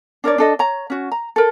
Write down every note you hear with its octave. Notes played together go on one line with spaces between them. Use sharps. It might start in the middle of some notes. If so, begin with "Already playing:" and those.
D4 A#4 C#5 D5
D4 A4 D#5
C#5 A#5
C#4 F#4
A#5
A4 A#4